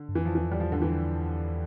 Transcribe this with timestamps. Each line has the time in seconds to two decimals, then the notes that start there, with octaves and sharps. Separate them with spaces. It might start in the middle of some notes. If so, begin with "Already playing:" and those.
Already playing: D3
0.09 G2
0.15 F2 E3
0.25 F3
0.35 E2 E3
0.46 F2
0.51 G3
0.55 E2 F3
0.72 D3
0.82 E3